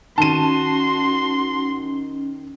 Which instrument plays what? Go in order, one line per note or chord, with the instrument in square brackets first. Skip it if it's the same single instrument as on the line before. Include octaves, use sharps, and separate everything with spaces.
[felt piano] D#3 [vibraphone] C#4 [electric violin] F#4 C6 [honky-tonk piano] A5 D#7